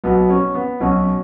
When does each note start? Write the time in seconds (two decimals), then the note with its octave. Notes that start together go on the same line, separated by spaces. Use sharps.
0.04 B1 B2 B3
0.29 C#4
0.55 B3
0.80 B1 B2 C#4